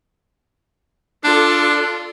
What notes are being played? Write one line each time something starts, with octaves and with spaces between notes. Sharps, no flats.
D4 F4 A4 D5